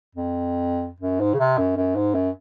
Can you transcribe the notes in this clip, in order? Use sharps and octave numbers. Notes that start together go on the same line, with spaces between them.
F2
F#2
G#2
C#3
C3
F#2
F#2
G#2
F#2